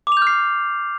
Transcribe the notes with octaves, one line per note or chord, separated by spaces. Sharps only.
D6 F6 G6 C7 F7